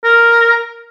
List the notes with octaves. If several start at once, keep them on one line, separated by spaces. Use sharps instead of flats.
A#4